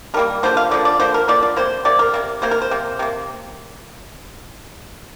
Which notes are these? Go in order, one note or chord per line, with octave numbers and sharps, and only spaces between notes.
D3 G3 A#3 A#4
D3 F3 A#3 C5
F5
D3 F3 A#3 D5
D5
D3 F3 A#3 C5
A#4
D3 F3 A#3 D5
D5
C3 A#3 C5
C3 A#3 D5
A#4
C3 A#3
C3 A#3 C5
A#4
C5
C3 A#3
C3 A#3